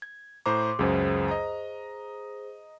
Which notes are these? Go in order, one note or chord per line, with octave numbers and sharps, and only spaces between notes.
G#6
A2 C5 A#5 C6 D6
C#2 F#2 G#4 C5
D#5 A#5